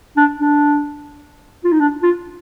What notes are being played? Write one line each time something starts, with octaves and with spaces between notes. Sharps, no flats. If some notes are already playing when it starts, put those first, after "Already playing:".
D4
D4
F4
D#4
D4
F4